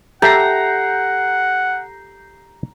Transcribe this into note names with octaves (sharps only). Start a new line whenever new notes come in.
G4 A4 E5 F#5 A#5 G6 C7